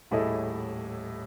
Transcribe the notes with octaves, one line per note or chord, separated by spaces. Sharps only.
D#1 A2 E4 G#4 A4 D#5